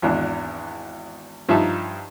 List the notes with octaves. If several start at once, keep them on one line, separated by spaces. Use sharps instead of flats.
G#1 E2 D4
G2 F3 D#4 E5 A5